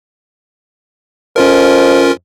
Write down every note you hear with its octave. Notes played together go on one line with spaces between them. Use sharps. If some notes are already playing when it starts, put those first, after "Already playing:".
F2 C#4 F4 A#4